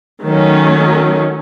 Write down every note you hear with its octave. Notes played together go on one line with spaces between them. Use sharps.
D#3 F#3 A3 C#4